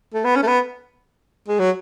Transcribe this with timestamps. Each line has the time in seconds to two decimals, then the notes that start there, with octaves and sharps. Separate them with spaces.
0.14 A3
0.25 B3
0.36 C#4
0.43 A3
0.47 B3
1.48 G#3
1.60 F#3